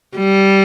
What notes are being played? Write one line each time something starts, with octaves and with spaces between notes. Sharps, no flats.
G3